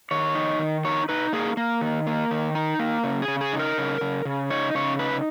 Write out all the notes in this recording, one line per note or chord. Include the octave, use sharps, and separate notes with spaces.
D#3 C#5
D#4
D#3
D#4 C#5
D#4 B4
A#3 G#4
A#3
D#3
A#3
D#3
D#4
A#3
C#3
G#4
C#3
G#4
D#4
A#4
C#3
C#3
C#3
D#4 C#5
C#3 C#5
D#4 B4